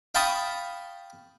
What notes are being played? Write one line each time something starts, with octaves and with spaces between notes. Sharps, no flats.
F5 G5 A5 B5 C#6 D#6